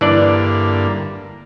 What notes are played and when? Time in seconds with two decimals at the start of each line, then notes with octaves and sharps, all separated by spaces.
0.01 G2 D3 E3 A#3 D4 D5